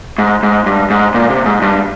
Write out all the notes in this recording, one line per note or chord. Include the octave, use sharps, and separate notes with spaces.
G#2
G#2
G2
G#2
A#2
C3
G#2
G2